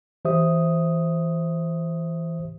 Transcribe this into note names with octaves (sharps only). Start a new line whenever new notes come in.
E3 G4 C5 E5 D#6